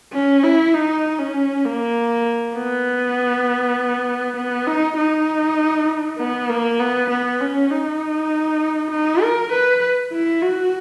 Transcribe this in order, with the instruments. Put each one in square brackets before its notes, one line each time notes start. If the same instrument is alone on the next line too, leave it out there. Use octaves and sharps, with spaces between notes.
[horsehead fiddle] C#4
E4
D#4
C#4
A#3
B3
B3
D#4
D#4
B3
A#3
B3
B3
C#4
D#4
D#4
A#4
B4
E4
F#4